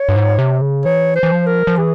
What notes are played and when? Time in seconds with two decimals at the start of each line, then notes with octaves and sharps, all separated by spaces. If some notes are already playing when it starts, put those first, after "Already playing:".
Already playing: C#5
0.09 G2
0.16 G#2
0.38 C3
0.61 C#3
0.85 E3 C#5
1.15 C5
1.23 E3
1.32 F3
1.46 A#4
1.67 F3
1.78 E3 G#4